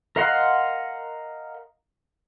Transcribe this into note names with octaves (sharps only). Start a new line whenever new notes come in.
A#4 D#5 F5 F#5 C6